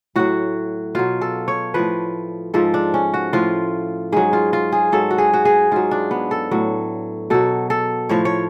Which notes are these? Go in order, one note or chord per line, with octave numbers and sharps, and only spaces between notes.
A2 F#3 F#4
B2 F#3 F4
A4
C#5
A2 F3 B4
G#2 F3 A4
D4
C#4
F#4
A2 F3 F4
G#2 F#3 G#4
F4
F4
G#4
G#2 F#3 A4
F#4
G#4
F#4
G#4
G#2 F#3 F4
D4
B3
A4
A2 F#3
B2 F#3 A4
A4
A2 F3 C#5
C#5